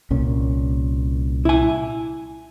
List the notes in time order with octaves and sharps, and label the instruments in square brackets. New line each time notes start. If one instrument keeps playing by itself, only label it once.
[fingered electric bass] C2 A#2 C#4
[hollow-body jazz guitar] E4 G#5